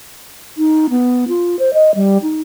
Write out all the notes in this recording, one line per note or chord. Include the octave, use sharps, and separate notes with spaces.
D#4
B3
F4
C5
D#5
G3
D#4